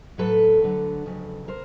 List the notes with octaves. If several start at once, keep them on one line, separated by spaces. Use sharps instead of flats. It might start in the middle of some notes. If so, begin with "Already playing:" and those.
A2 F#3 A4 B4
D2 D3 F#3
F2 C#3 F#3
C#3 A#4 C5